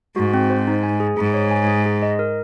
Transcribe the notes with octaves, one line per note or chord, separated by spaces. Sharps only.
G#2 F#4
C4
C5
D#4
G#5
G#4
G#2 G#4
C#5
G#5
G#4
G#4
D#5
A#4